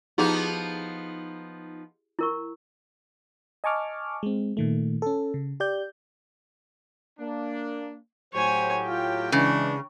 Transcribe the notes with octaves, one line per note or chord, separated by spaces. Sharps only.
F3 B3 D#4 E4 G4 G#4
E4 A#4 C#6
D#5 G#5 A5 C#6 D6 F6
G#3 C4
A#2 D#3 A3
C#4 A4
C#3
G4 D5 G6
A#3 D4
A2 F#3 G4 C5 C#5 G#5
F4 G5
C#3 E3 G#3 D4